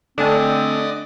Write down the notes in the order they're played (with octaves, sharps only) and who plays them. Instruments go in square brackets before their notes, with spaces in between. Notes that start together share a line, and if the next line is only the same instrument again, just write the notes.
[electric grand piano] D3 A3 G#5 [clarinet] C4 [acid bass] D4 [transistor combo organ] D5 D#5